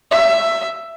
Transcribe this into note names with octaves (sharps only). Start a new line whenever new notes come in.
E5